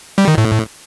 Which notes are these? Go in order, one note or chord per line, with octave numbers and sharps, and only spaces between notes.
G3
D#3
A2